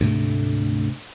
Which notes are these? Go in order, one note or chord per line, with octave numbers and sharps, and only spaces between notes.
D2 G#2 C3 A3